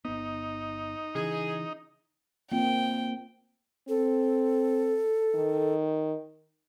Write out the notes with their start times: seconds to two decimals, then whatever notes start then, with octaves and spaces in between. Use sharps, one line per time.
0.05 G1 B3 D#4
1.15 C#3 E3 G#4
2.52 A#3 C4 F4 G5
3.89 C4 A4
5.35 D#3